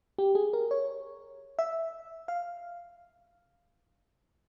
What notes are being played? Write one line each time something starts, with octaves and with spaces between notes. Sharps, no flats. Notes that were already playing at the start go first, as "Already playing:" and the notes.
G4
G#4
A#4
C#5
E5
F5